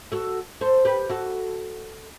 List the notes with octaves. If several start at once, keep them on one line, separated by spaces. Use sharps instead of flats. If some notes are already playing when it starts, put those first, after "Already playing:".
F#4 A4
A4 C5
G4 B4
F#4 A4